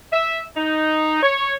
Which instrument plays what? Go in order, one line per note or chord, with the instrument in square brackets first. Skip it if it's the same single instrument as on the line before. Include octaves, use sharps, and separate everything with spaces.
[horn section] E5
D#4
C#5